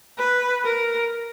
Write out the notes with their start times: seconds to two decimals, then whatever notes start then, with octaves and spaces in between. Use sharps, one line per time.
0.19 B4
0.65 A#4